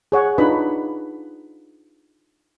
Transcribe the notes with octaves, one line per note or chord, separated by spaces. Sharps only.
G#4 C#5 F#5
D4 D#4 F4 B4 B5